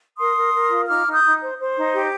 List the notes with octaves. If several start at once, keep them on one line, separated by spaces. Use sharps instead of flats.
A#4 C6 D#6
A#4
A#4
F4
D#4 D6 F6
D#4
D#6 G6
D#4
C5
C5
D#4
G4